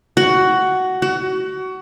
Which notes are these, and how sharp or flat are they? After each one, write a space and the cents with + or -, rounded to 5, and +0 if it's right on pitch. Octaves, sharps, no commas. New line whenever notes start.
F#4 +10
F#4 +25